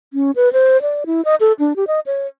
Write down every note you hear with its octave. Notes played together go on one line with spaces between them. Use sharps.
C#4
B4
C5
D5
E4
D#5
A4
D4
G4
D#5
C#5